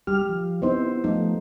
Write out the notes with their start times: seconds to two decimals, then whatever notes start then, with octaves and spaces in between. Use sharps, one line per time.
0.07 G3 G4 F6
0.29 F3
0.62 B3 C4 D#4 E4 C5
1.04 F3 A3 D#4